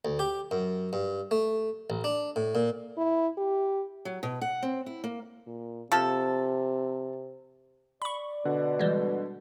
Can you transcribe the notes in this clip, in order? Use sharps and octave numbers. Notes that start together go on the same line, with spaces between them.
D2
G4
F#2
G2
A3
A1
D4
A2
A#2
E4
G4
F#3
B2
F#5
C4
E4
A#3
A#2
C3 F3 A4
D5 B5 C#6
B2 D3 F#5
E3 G3 G#3